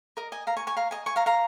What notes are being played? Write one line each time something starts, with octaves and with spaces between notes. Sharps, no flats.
A#4 D#5
D#5 G#5
F5 A#5
G#5 C#6
G#5 C#6
F5 A#5
D#5 G#5
G#5 C#6
F5 A#5
F5 A#5